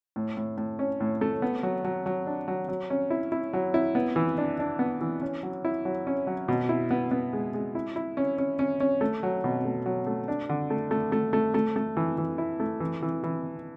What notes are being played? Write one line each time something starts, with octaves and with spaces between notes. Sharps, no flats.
A2
A2
A2
C#4
A2
A3
B3
F#3
F#3
F#3
D4
F#3
F#3
C#4
E4
E4
F#3
E4
B3
E3
D4
D4
B3
E3
C#4
F#3
E4
F#3
C#4
F#3
B2
E4
B3
B3
G#3
G#3
E4
E4
C#4
C#4
C#4
C#4
A3
F#3
B2
A3
F#3
A3
D4
D3
A3
A3
A3
A3
A3
A3
E3
E3
E4
A3
E3
E3
E3